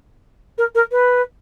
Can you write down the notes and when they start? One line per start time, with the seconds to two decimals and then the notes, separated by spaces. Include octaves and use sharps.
0.58 A#4
0.75 A#4
0.91 B4